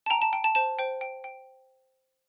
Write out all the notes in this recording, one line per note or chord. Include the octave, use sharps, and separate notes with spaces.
A5
G5 A#5
A5
G5
A5
C5 A5
C5 G5
G5
G5